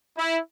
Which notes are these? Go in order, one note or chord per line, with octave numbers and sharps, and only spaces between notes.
E4